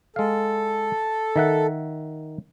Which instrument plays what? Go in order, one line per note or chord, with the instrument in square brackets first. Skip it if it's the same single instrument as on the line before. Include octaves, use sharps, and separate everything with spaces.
[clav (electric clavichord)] G#3 F5 [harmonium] A4
[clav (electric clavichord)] D#3 E5 F#5